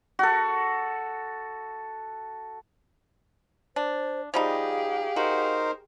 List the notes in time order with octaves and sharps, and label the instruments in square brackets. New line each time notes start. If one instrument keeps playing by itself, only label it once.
[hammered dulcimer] F#4 A4
[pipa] D4 [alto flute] C5
[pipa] F3 G3 D#4 [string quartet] G4 G#4 [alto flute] F5
[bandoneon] D#4 A#4 C5 [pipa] F#4